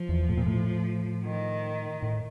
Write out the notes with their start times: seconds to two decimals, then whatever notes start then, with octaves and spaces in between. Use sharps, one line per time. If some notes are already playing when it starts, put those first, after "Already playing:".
Already playing: F3
0.09 E2
0.29 A2
0.37 A#2
0.46 A2
1.25 D#3
2.02 A2